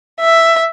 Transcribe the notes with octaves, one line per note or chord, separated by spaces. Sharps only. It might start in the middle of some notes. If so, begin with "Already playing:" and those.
E5